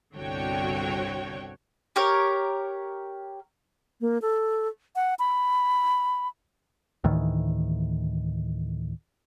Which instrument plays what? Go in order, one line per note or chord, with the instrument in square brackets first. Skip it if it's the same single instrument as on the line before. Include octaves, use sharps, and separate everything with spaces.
[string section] G1 C2 D3 F#4 C#5 G5
[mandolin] G4 A#4 C#5
[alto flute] A#3
A4
F#5
B5
[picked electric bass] D2 A2 D#3 E3